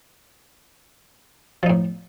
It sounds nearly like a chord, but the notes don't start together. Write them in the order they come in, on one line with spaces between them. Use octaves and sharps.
F3 D#4 A2